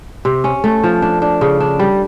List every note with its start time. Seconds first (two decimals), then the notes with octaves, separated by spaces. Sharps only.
0.25 C3
0.44 C#4
0.64 A3
0.84 F3
1.02 D4
1.22 D4
1.41 C#3
1.60 D4
1.79 G3